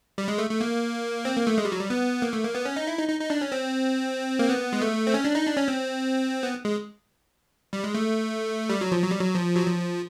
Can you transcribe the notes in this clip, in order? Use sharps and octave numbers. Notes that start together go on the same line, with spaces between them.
G3
G#3
A3
A3
A#3
C4
A#3
A3
G#3
G3
F#3
G3
B3
A#3
A3
A#3
B3
C#4
D#4
E4
D#4
D#4
D#4
D4
C#4
C4
A#3
B3
G#3
A3
C4
C#4
D4
D#4
D4
C#4
C4
B3
G#3
G3
G#3
A3
G3
F#3
F3
F#3
G3
F#3
F3
F#3
F3